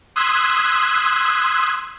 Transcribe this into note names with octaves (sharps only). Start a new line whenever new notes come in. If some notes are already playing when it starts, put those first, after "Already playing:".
C6 D#6 E6 F#6 G#6 B6